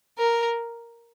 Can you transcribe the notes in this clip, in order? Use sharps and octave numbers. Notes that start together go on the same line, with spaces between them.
A#4